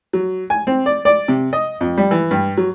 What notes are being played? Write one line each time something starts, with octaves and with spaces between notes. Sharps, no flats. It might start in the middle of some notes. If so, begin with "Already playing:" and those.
F#3
G#5
C4
D5
D5
C3
D#5
F2
G3
E3
G2
F#3